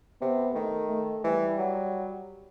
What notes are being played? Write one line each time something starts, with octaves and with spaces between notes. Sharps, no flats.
C3 B3
D#3 A3
A3
E3 G3
F#3